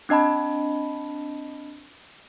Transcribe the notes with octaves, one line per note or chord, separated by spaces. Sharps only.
C4 D4 D#5 A5 B5